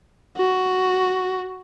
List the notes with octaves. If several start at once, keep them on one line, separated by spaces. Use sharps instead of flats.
F#4